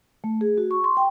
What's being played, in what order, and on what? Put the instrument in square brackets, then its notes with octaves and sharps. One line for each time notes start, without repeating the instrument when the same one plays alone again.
[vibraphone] A3
G#4
F#4
C#6
C6
G5